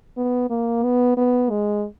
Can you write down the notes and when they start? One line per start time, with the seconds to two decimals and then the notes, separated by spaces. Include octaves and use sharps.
0.17 B3
0.50 A#3
0.83 B3
1.17 B3
1.50 G#3